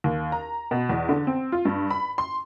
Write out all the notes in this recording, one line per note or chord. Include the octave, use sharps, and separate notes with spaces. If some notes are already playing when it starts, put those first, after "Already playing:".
D#2
A#5
B2
E2
D3
C4
F4
G2
B5
C6